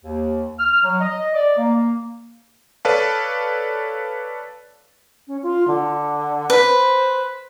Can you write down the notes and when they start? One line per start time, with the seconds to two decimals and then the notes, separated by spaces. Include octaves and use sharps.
0.04 D#2
0.58 F6
0.83 F#3
1.00 D#5
1.34 D5
1.58 A#3
2.85 A4 B4 C#5 D5 F5 A5
5.28 C#4
5.43 F4
5.68 D3
6.50 B4
6.64 C5